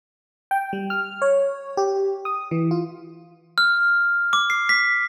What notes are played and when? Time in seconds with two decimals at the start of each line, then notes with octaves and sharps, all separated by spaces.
0.51 G5
0.73 G3
0.90 F6
1.22 C#5
1.77 G4
2.25 D#6
2.51 E3
2.71 F4
3.58 F6
4.33 D6
4.50 C7
4.69 B6